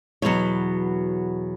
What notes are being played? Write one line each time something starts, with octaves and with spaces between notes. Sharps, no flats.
E2 B2 F#3 C#5